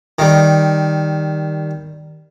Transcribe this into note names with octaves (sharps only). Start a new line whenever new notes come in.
D#3 G3